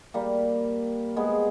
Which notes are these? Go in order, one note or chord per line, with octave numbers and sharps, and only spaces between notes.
G3 A#3
G#3 B3